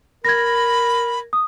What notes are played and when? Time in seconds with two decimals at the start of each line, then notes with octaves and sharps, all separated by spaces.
0.25 A#4 B5 G#6 A#6
1.33 D#6